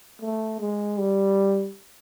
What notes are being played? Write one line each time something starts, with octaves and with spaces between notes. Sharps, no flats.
A3
G#3
G3